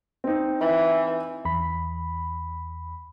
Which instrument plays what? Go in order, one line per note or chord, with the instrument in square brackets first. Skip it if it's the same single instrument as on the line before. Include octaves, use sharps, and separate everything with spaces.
[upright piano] C4 D#4
[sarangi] E3
[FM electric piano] E2 B5